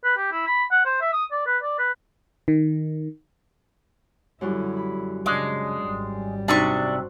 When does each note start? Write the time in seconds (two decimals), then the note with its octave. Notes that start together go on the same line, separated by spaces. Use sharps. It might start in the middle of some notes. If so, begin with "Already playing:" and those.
0.04 B4
0.17 G4
0.32 E4
0.47 B5
0.71 F#5
0.85 C5
1.01 E5
1.13 D#6
1.32 D5
1.46 B4
1.63 D5
1.79 B4
2.48 D#3
4.41 F#2 D3 F#3 G3 E4
4.77 B5
5.26 C#3 G#3 D4 F#5 D6
5.80 G#1 G3
6.48 C3 D4 D#4 F#4 C5 F#5 C#6